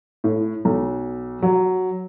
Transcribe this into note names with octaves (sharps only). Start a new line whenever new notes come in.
A2
B1
F#3